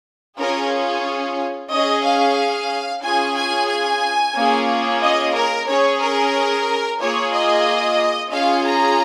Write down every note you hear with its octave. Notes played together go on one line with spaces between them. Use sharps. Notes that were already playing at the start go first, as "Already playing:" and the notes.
C#4 F4 G#4 A#4
C#4 G#4 D#5
F5
C#4 F4 G#4 G#5
G#5
G#5
A#3 C#4 F4 G#4
D#5
A#4
C#4 G#4 C#5
A#4
A#3 F4 G#4 C#5
D#5
C#4 F4 G#4 F5
A#5